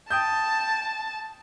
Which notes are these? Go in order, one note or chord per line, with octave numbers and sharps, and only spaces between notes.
G5 A5 D#6 G6